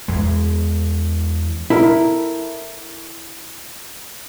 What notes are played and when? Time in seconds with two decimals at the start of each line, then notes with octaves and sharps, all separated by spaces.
0.08 E2 G#3
1.70 E4 A4 A#4